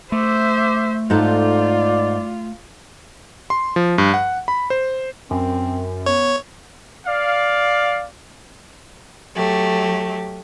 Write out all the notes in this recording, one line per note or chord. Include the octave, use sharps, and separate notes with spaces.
A3 C5 E5 D6
G#2 D#4 F4 A4 D5
C6
F3
G2
F#5
B5
C5
F#2 C4
B3 C#5
D5 F5
F#3 A3 G4